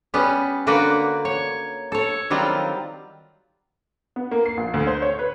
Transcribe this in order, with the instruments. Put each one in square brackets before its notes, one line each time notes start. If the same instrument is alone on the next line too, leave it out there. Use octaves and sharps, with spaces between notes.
[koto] G3 B3 C#4
D3 A#3 F#4 B4 D5 G5
C#5
A4 C#5
D#3 F#3 G3 C4 F4
[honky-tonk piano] B3
A#3
C7
A#1
D2
C5
C#5
B4